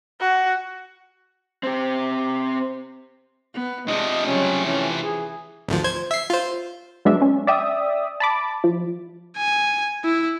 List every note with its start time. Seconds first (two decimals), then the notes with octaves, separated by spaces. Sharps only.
0.21 F#4
1.63 C4 G4
3.54 B3
3.88 C3 F3 G#3 D4 D#5
4.26 C#3 F#3 G3 C#4
4.65 E3 C#4
5.03 G#4
5.69 G#1 D2 F3
5.84 C5 G#6
6.11 E5 C7
6.30 F4 C5
7.05 F#3 G#3 B3 D4 E5
7.22 C#4
7.47 D5 E5 G5 D#6
8.20 A5 B5 D6
8.64 F3
9.37 G#5
10.05 E4